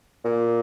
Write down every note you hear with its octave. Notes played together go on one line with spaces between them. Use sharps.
A#2